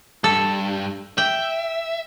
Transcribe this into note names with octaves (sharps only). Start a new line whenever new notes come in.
G2 A4
E5 G5